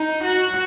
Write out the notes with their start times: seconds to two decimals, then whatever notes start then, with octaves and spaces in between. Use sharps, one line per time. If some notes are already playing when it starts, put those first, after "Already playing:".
Already playing: D#4
0.24 F#4